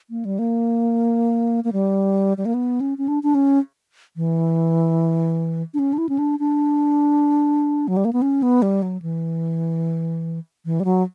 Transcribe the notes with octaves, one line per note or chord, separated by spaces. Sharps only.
A#3
G3
A#3
A#3
G3
G3
A#3
B3
C#4
C#4
D4
D4
C#4
E3
D4
C#4
D4
E4
C#4
D4
D4
F#3
G3
A#3
B3
C#4
B3
G3
F#3
E3
E3
G3
F#3